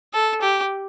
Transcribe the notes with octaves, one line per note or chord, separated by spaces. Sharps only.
A4
G4